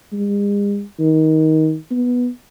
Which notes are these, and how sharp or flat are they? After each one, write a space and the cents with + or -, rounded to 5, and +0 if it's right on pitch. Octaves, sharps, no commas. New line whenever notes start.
G#3 -45
D#3 +20
B3 -5